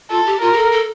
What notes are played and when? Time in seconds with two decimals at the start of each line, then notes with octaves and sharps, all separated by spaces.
0.10 F4 A4
0.26 G4
0.41 F4 A#4
0.53 G4
0.57 A4
0.72 A4